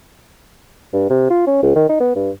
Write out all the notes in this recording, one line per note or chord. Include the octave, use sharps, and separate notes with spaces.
G2
C3
F4
C#4
C#2
D#3
D#4
B3
G2